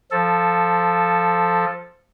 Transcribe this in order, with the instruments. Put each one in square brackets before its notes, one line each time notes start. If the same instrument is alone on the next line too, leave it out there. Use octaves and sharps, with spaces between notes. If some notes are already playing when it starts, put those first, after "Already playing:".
[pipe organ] F3 A4